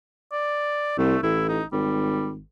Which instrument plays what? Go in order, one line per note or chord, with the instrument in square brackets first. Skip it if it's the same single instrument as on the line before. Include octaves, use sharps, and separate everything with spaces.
[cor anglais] D5
[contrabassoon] C2 [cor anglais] A3
[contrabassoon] A1 [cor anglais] E4
[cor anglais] D#4
[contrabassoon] G#1 [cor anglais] G3